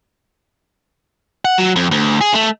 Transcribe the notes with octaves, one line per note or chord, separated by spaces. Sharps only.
F#5
F#3
F2
D2
G#4
A3